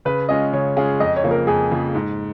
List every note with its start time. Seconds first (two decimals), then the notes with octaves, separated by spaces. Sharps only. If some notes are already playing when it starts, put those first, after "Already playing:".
0.05 C#3 B4
0.29 G#3 C#4 F4 G#4 D#5
0.53 C#3 C#5
0.77 G#3 C#4 F4 G#4
1.00 F2 D#5
1.16 C#5
1.24 C#3 F3 A#3
1.31 A#4
1.47 F2 G#4
1.71 C#3 F3 A#3
1.95 G#2